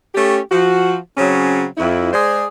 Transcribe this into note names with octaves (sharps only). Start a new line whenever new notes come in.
A3 C#4 G4
F3 F#4
C#3 F#3 C4 C#4
F2 E4
G#3 G#4 C5 D5